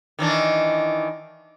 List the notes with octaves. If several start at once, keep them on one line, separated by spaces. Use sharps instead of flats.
D#3 E3 D4